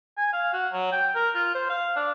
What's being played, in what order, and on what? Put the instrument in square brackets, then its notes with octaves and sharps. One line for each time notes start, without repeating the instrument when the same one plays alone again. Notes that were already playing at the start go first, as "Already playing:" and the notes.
[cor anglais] G#5
F5
F#4
F#3
G5
A#4
F4
C5
F5
D4